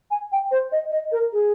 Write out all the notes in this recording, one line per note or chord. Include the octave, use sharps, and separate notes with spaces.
G#5
G5
C5
D#5
D#5
A#4
G#4